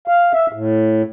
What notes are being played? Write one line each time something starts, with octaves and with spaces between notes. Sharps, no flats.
F5
E5
A2